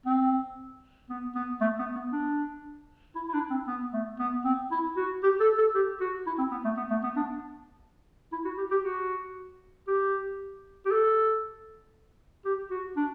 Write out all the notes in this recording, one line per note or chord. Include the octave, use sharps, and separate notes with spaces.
C4
B3
B3
A3
B3
B3
D4
E4
E4
D4
C4
B3
A3
B3
C4
E4
F#4
G4
A4
A4
G4
F#4
E4
C4
B3
A3
B3
A3
B3
D4
E4
F#4
G4
G4
F#4
G4
G4
A4
G4
F#4
D4